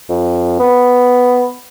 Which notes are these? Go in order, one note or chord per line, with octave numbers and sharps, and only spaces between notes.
F2
B3